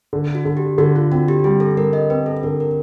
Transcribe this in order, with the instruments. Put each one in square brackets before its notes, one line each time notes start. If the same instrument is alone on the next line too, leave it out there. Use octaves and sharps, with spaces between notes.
[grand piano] D3
[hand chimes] F#4
[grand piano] D3
[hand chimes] G4
[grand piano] D3 [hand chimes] F#4
[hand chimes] F4
[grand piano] C4 [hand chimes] F#4
[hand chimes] G4
[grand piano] G3 [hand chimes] G#4
[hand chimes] A4
[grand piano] G3 [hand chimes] A#4
[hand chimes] D#5
[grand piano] C4 [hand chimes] B4
[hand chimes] A4
[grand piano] D3 [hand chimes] A#4
[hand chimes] A#4